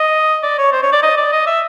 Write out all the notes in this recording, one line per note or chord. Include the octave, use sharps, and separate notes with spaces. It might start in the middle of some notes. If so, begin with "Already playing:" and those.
Already playing: D#5
D5
C#5
C5
C#5
D5
D#5
D5
D#5
E5